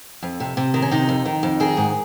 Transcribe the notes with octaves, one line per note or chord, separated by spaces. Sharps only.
F2
C3
C3
D#3
C#4
C3 D#4
F2
D#3
F2
D#3 G#4
G#2